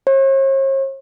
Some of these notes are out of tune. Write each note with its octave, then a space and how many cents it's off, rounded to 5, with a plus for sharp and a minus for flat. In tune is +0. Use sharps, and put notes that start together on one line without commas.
C#5 -45